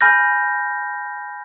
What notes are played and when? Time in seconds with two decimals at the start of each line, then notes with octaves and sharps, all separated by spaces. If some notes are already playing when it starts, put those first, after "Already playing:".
0.01 G#5 B5 F6 G6 A#6